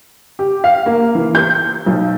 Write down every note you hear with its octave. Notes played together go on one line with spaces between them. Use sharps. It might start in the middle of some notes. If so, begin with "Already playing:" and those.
G4
F5
A#3
E3
G6
B1